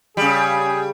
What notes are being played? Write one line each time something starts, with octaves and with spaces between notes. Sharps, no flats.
C#3 G3 G#4